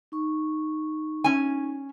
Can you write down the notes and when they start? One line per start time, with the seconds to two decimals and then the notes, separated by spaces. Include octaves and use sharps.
0.12 D#4 C#6
1.24 C#4 G#5